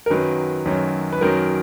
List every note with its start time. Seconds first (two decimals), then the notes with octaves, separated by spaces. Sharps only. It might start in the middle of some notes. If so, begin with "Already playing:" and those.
0.06 A#4
0.10 F#2 D#3 F#3 B4
0.66 F#2 D#3 F#3
1.13 B4
1.21 F#2 D#3 F#3 A#4